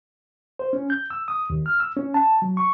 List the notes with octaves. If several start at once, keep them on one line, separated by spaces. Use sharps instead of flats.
C5
C#4
G6
E6
D#6
D#2
F6
E6
C#4
A5
F#3
C#6